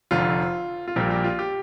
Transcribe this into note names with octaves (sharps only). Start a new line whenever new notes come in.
F1 F2 D3 F4
F4
A#1 A#2 G3 A#3 G4
G4
F4
G4